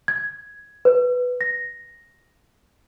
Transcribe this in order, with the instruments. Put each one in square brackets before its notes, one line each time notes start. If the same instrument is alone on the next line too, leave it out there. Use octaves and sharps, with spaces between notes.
[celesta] G#6
B4
A#6